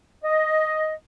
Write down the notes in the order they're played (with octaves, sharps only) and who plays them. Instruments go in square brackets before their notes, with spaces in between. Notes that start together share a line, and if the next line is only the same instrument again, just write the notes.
[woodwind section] D#5